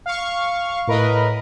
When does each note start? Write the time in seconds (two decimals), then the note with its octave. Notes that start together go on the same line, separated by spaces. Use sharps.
0.06 F5 C#6
0.87 A2 A#4 B4 D#5